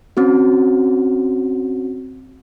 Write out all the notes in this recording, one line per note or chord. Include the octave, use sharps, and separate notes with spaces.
C4 C#4 F#4